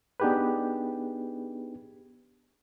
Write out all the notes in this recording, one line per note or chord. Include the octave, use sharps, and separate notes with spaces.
B3 D4 D#4 G4 G#4 B4